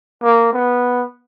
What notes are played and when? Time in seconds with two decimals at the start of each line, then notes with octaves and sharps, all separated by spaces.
0.23 A#3
0.53 B3